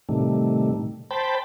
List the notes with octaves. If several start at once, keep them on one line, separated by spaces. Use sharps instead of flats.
A2 C3 D#3 G3 A3
C5 G5 A5 B5